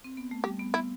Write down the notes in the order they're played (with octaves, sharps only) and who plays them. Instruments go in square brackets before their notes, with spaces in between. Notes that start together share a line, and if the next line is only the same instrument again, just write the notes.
[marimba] C4
B3
A3
[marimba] G3 [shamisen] G4
[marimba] B3
[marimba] B3 [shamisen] E4